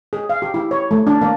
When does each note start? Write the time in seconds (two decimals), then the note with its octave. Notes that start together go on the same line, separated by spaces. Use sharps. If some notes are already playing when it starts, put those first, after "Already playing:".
0.13 G#4
0.30 F5
0.42 G4
0.54 E4
0.71 C#5
0.91 A3
1.07 D4
1.22 A#3